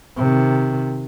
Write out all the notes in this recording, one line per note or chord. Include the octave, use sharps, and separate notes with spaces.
C3 D#3